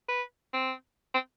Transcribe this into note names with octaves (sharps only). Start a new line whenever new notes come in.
B4
C4
C4